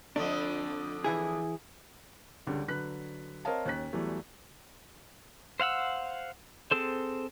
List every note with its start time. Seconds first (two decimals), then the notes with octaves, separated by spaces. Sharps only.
0.16 F2 D3 A3 D4
1.04 E3 E4 G#4
2.47 C#2 D3 G3
2.68 D3 F#3 B4 F#6 B6
3.45 C4 A#4 C#5 D#5 F5 A5
3.65 D#2 C#4 F#6 B6
3.93 E2 E3 F#3 G3 A3
5.60 C5 F5 F#5 E6
6.71 C4 G#4 A4 C5